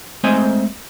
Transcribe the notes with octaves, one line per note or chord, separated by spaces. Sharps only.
G#3 A3 C4 C5 D#5 G#5